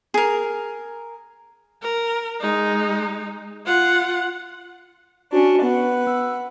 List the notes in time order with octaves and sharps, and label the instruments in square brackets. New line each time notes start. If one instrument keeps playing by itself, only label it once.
[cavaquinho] G#4 A#4
[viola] A#4
G#3 D#4
F4 F#5
[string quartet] C#4 D4 [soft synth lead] F#4
[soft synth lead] B3 [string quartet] B4 F#5
[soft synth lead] E6